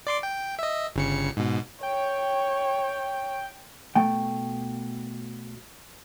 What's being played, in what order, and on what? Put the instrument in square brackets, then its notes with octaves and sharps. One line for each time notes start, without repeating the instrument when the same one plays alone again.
[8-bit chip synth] D5 C6 D6
G5
D#5 E5
G1 C#3 C#7
G#2 B2
[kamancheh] C#5 [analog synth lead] G5
[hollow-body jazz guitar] B2 A3 G5